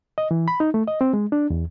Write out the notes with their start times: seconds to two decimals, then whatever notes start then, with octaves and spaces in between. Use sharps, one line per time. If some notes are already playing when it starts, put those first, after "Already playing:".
0.18 D#5
0.31 E3
0.48 B5
0.60 D#4
0.74 A3
0.88 D#5
1.01 C4
1.13 G#3
1.32 D4
1.50 E2